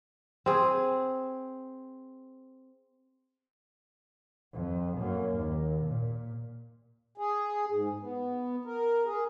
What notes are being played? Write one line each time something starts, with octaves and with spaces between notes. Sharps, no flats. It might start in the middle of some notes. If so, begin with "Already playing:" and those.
C4 G#4
F2
F#2 A#3
D#2
A#2
G#4
G#2
B3
A#4
G#4